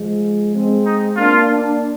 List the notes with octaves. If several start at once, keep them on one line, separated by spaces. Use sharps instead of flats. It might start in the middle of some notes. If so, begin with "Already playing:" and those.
Already playing: F3 G#3
G#3 C4
D#4
A#3 D4 F4
A#3 D4